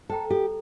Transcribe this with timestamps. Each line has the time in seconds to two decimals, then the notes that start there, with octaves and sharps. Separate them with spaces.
0.09 A4 C5 G5 A#5
0.30 G4 A4